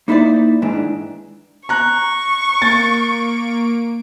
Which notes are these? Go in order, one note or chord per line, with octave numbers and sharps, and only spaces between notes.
A#3 D#4 E4 A4 C5 D5
G#2 D#3 E3 D4
A#5 C#6 F#6
A#3 A6 D7